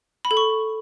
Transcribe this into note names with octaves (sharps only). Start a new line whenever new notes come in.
B5
A4
C#6